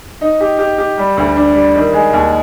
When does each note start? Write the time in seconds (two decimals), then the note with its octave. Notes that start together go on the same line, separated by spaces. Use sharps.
0.21 D#4
0.40 G4
0.59 G4
0.78 G4
0.98 G3
1.17 D2
1.36 D4
1.55 G3
1.75 D#3
1.93 G#3
2.13 D#2